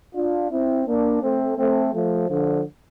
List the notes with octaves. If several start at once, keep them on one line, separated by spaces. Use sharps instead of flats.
D4 F4
C4 E4
A#3 D4
A3 C4
A3 C4
F3 A3
D3 F3